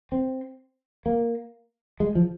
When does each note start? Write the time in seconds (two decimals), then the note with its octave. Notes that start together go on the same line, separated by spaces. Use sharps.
0.12 C4
1.06 A#3
2.00 G#3
2.15 F3